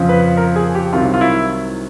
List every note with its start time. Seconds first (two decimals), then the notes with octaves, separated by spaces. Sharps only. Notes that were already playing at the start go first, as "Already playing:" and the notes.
Already playing: F2 C#3 F3
0.09 B4
0.37 A#4
0.56 G#4
0.75 G4
0.93 C2 C3 D#3 F#3 F4
1.14 F4
1.21 E4